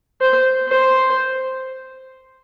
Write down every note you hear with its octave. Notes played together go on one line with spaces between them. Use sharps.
C5
C5